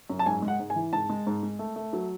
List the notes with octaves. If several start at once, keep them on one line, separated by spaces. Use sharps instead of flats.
F#2
A5
G#2 G#5
G#3
F#5
G#2
G#5
E3
G#2 A5
G#3
G#2
G#3
A3
A3
F#3